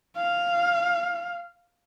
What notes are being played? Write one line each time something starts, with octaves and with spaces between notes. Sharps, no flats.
F5